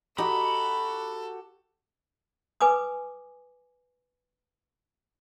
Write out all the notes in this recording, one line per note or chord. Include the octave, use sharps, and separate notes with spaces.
D#4 F#4 G4 A4 B5
B4 G#5 D6 D#6